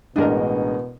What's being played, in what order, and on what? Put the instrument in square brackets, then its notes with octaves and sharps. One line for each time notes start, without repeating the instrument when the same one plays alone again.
[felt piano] A1 G#3 D#5 [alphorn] B2 [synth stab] D4 A#4